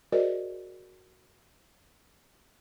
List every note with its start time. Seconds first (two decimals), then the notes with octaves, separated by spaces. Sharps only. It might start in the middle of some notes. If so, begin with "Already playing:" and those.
0.12 F#4 G#4 A#4 C5 D5 D#5